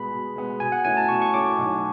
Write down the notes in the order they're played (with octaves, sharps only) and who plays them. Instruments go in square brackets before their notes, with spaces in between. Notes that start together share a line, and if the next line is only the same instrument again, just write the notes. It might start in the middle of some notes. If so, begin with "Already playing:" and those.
Already playing: [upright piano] B2 G#3 B3 [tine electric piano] B5
[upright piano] B2
G#3 B3
[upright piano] B2 [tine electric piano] G#5
[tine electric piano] F#5
[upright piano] A3 C#4 E4 [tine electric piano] G#5
[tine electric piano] A5
[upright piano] B2 [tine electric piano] C#6
[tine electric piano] C#6
[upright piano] A3 C#4 E4 [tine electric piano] D6
[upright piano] B1